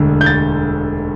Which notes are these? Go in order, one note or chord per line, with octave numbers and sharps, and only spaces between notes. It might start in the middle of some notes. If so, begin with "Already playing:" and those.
Already playing: E1 D2 D3
G6
A6